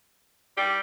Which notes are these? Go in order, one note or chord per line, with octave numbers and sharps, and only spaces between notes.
G3 G4